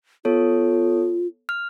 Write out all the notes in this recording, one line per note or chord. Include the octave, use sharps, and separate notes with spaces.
B3 F4 A4 C#5
F6